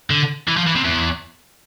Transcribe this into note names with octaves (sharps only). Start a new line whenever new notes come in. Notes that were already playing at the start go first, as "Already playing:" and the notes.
D3
E3
F3
E3
C3
E2